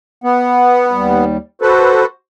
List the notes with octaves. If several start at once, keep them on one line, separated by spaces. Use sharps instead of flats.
B3 F#5
D#2 G3
F#4 A4 B4 C5